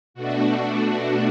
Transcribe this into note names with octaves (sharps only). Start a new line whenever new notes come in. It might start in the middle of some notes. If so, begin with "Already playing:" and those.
B2 A3 D4 F#4